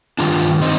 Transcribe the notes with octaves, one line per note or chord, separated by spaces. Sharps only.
G2 D#3 D4 F4
C4 D#4